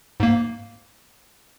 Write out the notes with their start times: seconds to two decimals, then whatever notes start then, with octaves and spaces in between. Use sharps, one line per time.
0.20 G#2 A#3